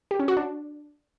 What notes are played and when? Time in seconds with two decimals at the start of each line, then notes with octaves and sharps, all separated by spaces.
0.11 G4
0.19 C#4
0.28 F#4
0.37 D4